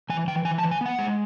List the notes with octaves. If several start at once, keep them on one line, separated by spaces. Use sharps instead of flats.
E3 G#5
E3 G5
E3 G#5
A5
E3
G#5
B3 F#5
G#3